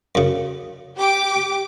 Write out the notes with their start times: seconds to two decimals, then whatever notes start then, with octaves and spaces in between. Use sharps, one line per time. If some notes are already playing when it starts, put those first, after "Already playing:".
0.15 F#2 C#3
0.97 G4 D6